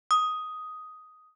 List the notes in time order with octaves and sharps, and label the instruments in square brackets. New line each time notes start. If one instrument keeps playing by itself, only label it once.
[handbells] D#6